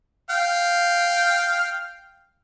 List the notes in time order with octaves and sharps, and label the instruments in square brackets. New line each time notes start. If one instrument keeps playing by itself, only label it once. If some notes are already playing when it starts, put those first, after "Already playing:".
[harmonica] F5 G5